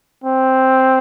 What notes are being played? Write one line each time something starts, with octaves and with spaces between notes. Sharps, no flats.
C4